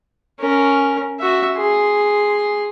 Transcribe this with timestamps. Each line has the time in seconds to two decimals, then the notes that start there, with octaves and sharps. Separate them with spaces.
0.40 C#4 A#4
1.19 F#4 E5
1.57 G#4 C6